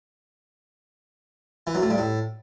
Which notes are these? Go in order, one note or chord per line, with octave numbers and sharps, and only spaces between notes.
E3
F#2
A2
G2
A2